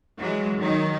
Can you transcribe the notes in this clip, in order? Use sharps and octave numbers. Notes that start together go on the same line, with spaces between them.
E3 F#3 G#3
D#3 F#3 D#4